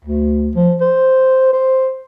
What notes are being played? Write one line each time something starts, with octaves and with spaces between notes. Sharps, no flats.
D2
F3
C5
C5